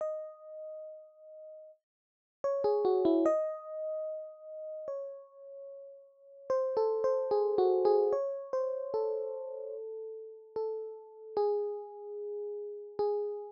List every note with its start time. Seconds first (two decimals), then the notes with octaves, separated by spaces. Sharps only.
0.01 D#5
2.44 C#5
2.64 G#4
2.85 F#4
3.05 E4
3.26 D#5
4.88 C#5
6.50 C5
6.77 A4
7.04 C5
7.31 G#4
7.58 F#4
7.85 G#4
8.13 C#5
8.53 C5
8.94 A4
10.56 A4
11.37 G#4
12.99 G#4